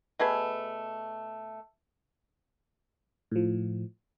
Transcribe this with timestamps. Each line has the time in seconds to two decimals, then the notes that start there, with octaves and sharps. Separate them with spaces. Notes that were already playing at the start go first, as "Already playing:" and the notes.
0.19 B2 A3 G#4 B4
3.32 A2 F3